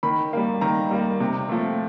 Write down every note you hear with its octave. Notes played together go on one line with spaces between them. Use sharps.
D#3 B5
G3 A#3
D#3 A#5
G3 A#3
C3
F3 A3